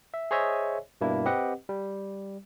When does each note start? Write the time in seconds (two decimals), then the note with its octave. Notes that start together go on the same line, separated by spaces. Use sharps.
0.14 E5
0.31 G#4 C5 C#5 D#5 E5 G#5
1.01 G2 B2 A#3 D4 E4
1.26 C4 G4 B4 D#5 F#5
1.69 G3